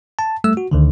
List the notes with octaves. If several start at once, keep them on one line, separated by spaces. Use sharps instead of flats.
A5
G3 A3 E6
F#4
D2 D3 D#3